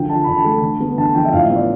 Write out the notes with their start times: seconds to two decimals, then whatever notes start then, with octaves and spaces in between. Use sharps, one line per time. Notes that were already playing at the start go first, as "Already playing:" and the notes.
Already playing: D3 F3 G5
0.09 D4 A5
0.24 D3 B5
0.37 A5
0.44 A3
0.62 D3
0.80 B3
0.98 D3 A5
1.15 F3 G5
1.25 E5
1.33 A2 F5
1.44 E5
1.50 B3
1.56 D5